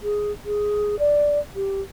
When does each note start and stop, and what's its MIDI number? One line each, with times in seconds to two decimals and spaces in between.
0.03 0.32 68
0.46 0.99 68
0.99 1.39 74
1.56 1.81 67